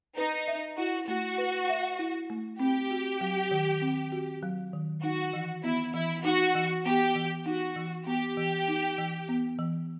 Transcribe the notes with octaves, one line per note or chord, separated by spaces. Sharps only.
D#4 B4
E5
E4 F#4
A3 F#4
B4
E5
E4
A3
C4 G4
F#4
F#3
D#3
C4
F#4
F#3
D#3
D#4 F#4
E3
B3 E4
E3 E4
D#4 F#4
E3
B3 G4
E3
D#4 F#4
E3
B3 G4
E3
D#4
E3
B3
E3